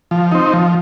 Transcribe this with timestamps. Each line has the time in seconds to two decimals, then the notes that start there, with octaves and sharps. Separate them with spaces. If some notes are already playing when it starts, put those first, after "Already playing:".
0.11 F3
0.32 C4 D#4
0.53 F3